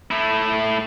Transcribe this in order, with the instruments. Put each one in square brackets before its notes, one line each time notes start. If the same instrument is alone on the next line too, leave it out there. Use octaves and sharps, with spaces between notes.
[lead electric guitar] A3 E4